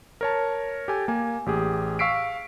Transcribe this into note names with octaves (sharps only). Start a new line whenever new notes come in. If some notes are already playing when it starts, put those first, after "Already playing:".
A#4 C#5 A5
G4 A4 G#5
A#3 G#5
A1 G4 G#4
F5 C#6 E6 B6 C7 D7